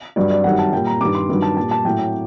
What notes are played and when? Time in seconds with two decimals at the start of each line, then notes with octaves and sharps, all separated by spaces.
0.16 G2 F#3 D5
0.30 D5
0.44 F#2 D#3 G3 F#5
0.59 A5
0.73 A#2 G3 G5
0.87 A#5
1.01 G2 D#3 G3 D6
1.15 C6
1.29 G2 D#3 F#3
1.42 A5
1.57 A#2 G3 A5
1.71 A5
1.85 A2 F#3 G5
1.99 G5